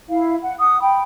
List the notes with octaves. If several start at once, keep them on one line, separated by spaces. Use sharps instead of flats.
E4 F5
F#5
F#5 D#6
G5 B5